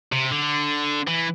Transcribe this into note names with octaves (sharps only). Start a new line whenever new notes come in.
C3
D3
E3